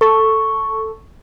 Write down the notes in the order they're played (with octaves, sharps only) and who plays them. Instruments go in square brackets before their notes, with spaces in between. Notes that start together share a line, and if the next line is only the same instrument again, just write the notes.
[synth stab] A4 [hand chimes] C#6